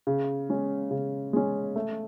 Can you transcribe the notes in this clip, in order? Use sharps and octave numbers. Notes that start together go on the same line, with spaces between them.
C#3
G#3 C#4
C#3
G#3 C#4
A3